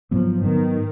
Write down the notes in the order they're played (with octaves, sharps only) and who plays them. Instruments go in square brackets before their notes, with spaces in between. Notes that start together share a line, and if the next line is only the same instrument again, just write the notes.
[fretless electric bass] G#2 F#3 B3 [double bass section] F3
[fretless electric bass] G#2 F#3 B3 [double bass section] D#3